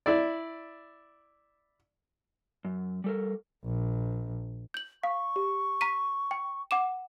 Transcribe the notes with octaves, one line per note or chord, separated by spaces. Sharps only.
E4 D5
F#2
G3 A4 A#4
A#1
G6 F#7
F5 C#6
G4
A#5 B6 D#7
G5
F#5 D6 E7